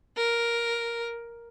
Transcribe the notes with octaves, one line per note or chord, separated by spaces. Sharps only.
A#4